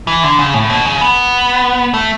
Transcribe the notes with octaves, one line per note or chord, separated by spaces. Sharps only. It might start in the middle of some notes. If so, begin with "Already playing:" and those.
E3
D3
C#3
A2
B2
C#3
B3
A3